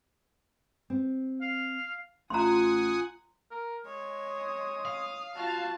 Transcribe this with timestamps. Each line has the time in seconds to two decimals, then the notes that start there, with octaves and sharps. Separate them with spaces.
0.90 C4
1.41 F5
2.30 A1 F4 F#5 G#5 A#5 C6 D#6
3.51 A#4
3.86 G#3 C#5
4.33 D#6
4.85 F5
5.36 F4 F#4 A5